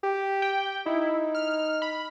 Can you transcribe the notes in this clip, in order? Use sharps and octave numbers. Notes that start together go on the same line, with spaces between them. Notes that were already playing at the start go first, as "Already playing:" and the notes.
G4
G5
D#4 E4
F6
B5